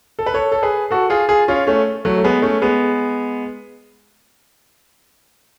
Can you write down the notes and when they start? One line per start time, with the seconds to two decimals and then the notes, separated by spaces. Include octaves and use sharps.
0.19 A4
0.26 B4
0.34 A4 C#5
0.52 A4
0.63 G#4 B4
0.91 F#4 A4
1.10 F4 G#4
1.28 F4 G#4
1.48 C#4 F4
1.67 A3 C#4
2.05 F#3 A3
2.18 A3
2.24 G#3 B3
2.42 A3 C#4
2.62 G#3 B3